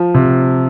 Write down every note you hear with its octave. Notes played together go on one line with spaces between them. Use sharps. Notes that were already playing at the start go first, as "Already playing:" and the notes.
Already playing: F3
C3